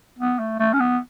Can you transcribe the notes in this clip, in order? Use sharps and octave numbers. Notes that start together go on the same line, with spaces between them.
B3
A3
A3
C#4
B3